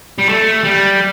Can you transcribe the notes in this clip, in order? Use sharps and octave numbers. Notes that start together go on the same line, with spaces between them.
G3
A3
G3